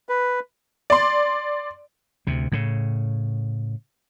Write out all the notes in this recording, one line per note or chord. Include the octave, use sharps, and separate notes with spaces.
B4
D5 C6
D2 C3
A2 C#3